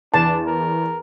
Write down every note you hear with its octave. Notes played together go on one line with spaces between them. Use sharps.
E2 D4 A5
A#4